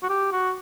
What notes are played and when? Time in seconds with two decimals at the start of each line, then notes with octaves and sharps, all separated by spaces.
0.03 F#4
0.09 G4
0.32 F#4